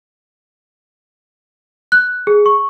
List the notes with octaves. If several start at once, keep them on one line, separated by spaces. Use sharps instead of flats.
F#6
G#4
C#6